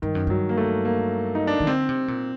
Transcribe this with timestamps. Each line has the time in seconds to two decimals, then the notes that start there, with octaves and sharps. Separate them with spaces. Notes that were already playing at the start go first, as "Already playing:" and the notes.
0.02 G2 D#3
0.15 F#2
0.27 G2 F#3
0.49 A#3
0.57 A3
0.85 A#3
1.35 D#4
1.47 D4
1.60 D#3
1.67 D3 C4
1.89 C3
2.08 A#2